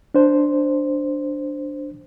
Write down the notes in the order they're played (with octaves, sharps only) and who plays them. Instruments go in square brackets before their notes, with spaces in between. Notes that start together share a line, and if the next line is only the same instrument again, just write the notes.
[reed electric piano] D4 C5